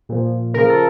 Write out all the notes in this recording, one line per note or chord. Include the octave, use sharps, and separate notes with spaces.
A#2 F3
C#3 F3 A#4
A4